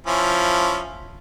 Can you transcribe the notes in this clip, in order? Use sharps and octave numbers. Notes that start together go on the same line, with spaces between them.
F3 C#4 E4